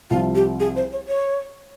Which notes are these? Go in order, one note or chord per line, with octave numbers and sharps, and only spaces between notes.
C2 C3 F3 F4
G4
G#4
C5
C#5
C#5